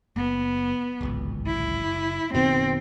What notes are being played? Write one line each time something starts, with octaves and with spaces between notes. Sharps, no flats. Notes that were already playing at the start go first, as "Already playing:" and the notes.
F#1 B3
D1 G#1 C#2
E4
F#1
F#1 B2 D#3 C4